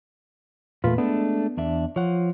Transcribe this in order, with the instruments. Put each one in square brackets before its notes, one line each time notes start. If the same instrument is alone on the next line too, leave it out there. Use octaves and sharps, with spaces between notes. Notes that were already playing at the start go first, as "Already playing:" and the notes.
[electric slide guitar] E2 A#2 B4 [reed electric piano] A3 F4
[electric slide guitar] G#3 A3 D4 [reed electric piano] B3
[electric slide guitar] E2 D4 E5
[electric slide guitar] F3 [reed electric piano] C#5 F#5